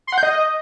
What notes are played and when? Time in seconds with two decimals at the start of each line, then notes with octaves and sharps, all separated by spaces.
0.07 C6
0.13 F#5
0.18 G6
0.23 D#5